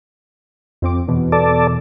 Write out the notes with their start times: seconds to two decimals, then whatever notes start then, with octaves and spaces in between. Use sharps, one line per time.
0.82 F2 C4 D6
1.08 E2 B2 E3
1.32 A4 D5